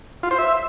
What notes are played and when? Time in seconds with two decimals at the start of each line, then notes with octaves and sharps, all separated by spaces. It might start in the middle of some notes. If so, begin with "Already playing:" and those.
0.23 F4
0.31 C5
0.39 E5